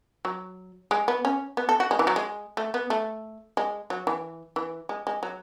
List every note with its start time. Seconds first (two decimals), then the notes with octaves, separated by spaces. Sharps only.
0.25 F#3
0.91 G#3
1.08 B3
1.25 C#4
1.57 B3
1.69 A4
1.80 F#4
1.91 G#3
1.99 E3
2.07 F#3
2.16 G#3
2.57 A3
2.74 B3
2.90 A3
3.57 G#3
3.90 F#3
4.07 E3
4.56 E3
4.89 G#3
5.07 G#3
5.23 F#3